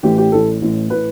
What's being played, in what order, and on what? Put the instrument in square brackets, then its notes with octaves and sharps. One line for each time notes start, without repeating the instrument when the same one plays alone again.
[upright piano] A1 A2 E3 G4
G4
A1 A2 E3 A4
A1 A2 E3
A2 E3 B4